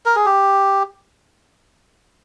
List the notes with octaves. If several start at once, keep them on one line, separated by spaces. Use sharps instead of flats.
A#4
G#4
G4